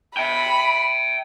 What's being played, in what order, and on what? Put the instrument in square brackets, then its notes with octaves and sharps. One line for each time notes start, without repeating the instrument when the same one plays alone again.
[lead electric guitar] E5 G5 [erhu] B5